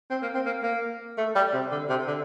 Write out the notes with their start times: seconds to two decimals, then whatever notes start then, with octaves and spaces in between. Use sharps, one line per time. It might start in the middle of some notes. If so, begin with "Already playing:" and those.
0.10 C4
0.22 A#3
0.34 C4
0.46 A#3
0.63 A#3
1.17 A3
1.35 G3
1.53 C3
1.72 D3
1.89 C3
2.07 D3